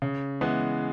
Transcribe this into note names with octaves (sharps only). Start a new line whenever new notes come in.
C#3
E3 G#3 B3